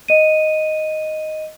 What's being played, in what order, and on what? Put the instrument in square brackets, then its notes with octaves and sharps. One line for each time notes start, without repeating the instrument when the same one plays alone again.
[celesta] D#5 D#7